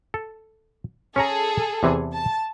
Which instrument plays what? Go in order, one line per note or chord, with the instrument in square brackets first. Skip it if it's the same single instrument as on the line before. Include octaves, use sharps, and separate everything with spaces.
[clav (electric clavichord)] A4
[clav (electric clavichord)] C#4 C#5 A#5 [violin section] G#4 A4
[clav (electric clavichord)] E2 C3 E3
[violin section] A5